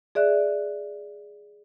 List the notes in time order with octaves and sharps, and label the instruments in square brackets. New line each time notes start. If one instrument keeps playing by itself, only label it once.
[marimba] G#4 D5 E5 F#6